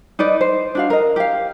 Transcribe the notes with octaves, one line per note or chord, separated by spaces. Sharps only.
D#4 B4 D5 D#5
C5
D4 F#4 F5
A#4 D#5
G4 F5